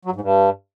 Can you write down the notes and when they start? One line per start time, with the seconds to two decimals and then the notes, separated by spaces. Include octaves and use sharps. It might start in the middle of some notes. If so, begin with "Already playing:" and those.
0.05 F#3
0.10 G2
0.16 G#2
0.21 G2